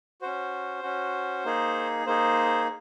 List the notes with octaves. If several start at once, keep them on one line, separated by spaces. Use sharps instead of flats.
C#4 F#4 C5
C#4 F#4
A#3 D#4 G#4
A#3 D#4 G#4 C5